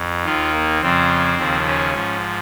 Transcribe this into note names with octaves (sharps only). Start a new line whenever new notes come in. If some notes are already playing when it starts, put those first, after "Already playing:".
Already playing: F2
D#2 D#3 F4
A#3
F2 C#3 F3 C4
D#2 C#3 F3
C#4
G#2 F3